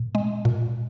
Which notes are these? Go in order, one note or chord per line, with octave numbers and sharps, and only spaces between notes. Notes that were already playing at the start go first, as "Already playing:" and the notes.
Already playing: A#2
G#3
A#2